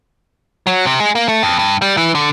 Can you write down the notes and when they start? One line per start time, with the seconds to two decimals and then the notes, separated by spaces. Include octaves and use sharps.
0.67 F#3
0.86 C3
1.00 G#3
1.15 A#3
1.28 A3
1.43 F2
1.59 G2
1.82 G3
1.97 E3
2.15 D3